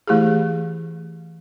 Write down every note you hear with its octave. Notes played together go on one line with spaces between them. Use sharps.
E3 A3 E4 G4 G#4